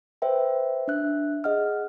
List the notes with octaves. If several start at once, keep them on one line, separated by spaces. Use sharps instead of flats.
B4 C5 E5 G5
D4 E5 F#6
G#4 D#5 F#5 F6